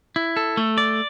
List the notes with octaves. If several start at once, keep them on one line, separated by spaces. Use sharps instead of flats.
E4
A4
A3
D5